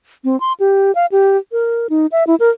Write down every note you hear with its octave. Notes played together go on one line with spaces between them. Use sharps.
C4
C6
G4
F5
G4
A#4
D#4
E5
E4
A#4